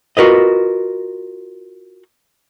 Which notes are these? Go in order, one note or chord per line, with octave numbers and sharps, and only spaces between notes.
F4 F#4 A#4 B4 D#5